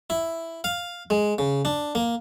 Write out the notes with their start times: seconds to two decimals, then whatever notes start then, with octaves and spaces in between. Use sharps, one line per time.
0.10 E4
0.64 F5
1.10 G#3
1.38 C#3
1.65 D4
1.95 A#3